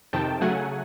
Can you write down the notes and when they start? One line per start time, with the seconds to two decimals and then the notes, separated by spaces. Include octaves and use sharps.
0.13 F2 C3 D#3 G5 A5
0.41 C#3 F#3 A3 F#5 G#5